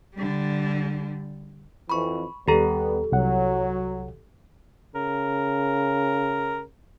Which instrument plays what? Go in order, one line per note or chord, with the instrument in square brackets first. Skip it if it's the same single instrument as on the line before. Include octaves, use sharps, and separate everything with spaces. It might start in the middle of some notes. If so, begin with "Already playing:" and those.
[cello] D3 G3
[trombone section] F2 E3 [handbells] B5 C#6
[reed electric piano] D#2 A#5 [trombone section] G3 B3 [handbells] G4 A4
[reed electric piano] C2 F#5 [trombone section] F#3
[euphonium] C#3 [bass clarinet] A#4